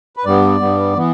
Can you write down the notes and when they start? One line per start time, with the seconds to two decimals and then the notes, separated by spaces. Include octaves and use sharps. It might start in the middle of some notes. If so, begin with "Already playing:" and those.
0.17 B4
0.25 G2 G3 B3 D5
0.60 G2 G3 B3
0.96 E3 B3